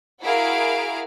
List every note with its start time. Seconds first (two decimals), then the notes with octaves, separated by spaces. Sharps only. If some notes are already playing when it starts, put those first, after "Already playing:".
0.22 E4 F#4 G#4 A#4 F5 D7